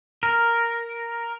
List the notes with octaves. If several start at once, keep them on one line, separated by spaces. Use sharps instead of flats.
A#4